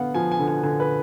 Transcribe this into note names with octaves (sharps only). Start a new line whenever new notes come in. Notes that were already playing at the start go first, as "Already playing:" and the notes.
Already playing: D3 B3 F5 F#5
F3 G#5
G#5
D3
G#5
D3 G#5
B4